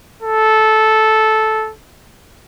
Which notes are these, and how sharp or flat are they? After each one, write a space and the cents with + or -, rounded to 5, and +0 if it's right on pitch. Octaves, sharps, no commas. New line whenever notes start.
A4 -10